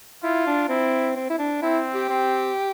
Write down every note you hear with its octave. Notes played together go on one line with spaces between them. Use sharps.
E4 F4
D4
C4 E4
C4
E4
D4
C4 E4
G4
C4